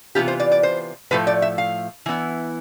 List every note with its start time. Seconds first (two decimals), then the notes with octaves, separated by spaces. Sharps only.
0.15 C3 E3 B3 F4 G4
0.28 C5
0.40 D5
0.52 D5
0.63 C5
1.11 A2 F3 A3 B4
1.27 D5
1.42 E5
1.58 F5
2.06 E3 B3 E4